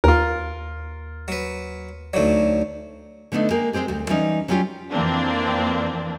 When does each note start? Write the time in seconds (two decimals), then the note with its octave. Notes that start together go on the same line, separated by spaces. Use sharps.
0.04 D#2 F4 A#4
1.28 F#3 B4
2.14 D2 F#3 D#4 C#5 D5
3.32 D3 A3 B3 D4 D#4
3.50 G#3 A#3 G4 A#4
3.73 G#3 B3 C4 G4 G#4
3.88 D2 G3
4.09 E3 G3 C#4 D#4
4.48 F#3 G3 C#4 F4 G4
4.91 F2 E3 A#3 C4 D4